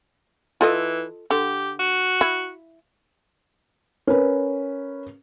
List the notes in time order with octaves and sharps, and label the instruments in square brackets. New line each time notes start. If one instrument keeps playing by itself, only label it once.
[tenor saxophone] E3 [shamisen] F4 A4 D#5
[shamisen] D3 [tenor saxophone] G4
[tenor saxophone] F#4
[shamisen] E4
[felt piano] C#4 A#4 B4